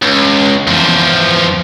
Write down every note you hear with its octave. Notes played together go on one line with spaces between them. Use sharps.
C#2
E2 F3